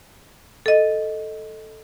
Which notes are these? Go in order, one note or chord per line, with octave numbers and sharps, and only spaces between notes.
A4 D#5